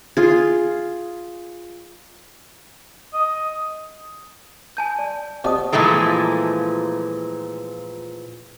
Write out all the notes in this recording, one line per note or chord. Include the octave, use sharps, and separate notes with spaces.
F4 G#4
D#5
G#5 A5 G6
D5
C3 F#4 D5 D#5 A5 D#6
A#2 E3 F3 G#3 A3